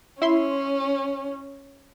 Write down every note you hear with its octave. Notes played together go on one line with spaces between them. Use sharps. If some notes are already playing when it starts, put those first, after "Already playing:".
C#4 E4 E5 C6